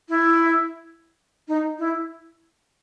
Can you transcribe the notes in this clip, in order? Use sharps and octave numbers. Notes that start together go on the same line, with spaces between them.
E4
D#4
E4